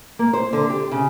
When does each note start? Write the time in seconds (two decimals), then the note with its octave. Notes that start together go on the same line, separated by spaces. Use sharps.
0.19 A#3
0.33 C5
0.53 D3
0.70 G4
0.91 C#3